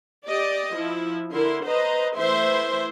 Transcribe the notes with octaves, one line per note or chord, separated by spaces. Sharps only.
G4 D5 D#5
F3 E4
D3 E4 A#4 C6
B4 C5 D#5 A#5
E3 A3 E4 C5 E5 C6